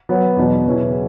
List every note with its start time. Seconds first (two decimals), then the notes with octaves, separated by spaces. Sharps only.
0.09 F#3 B3 F#4 C#5
0.37 E2 B2 F#3
0.65 E2 C#3 F#3 C#4 E4